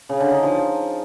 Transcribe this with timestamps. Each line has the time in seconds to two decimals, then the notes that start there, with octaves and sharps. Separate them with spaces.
0.09 C#3
0.20 D3
0.32 D#4
0.43 F3